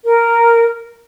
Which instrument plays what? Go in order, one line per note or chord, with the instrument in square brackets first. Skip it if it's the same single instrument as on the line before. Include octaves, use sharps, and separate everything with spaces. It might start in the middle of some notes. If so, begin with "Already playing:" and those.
[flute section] A#4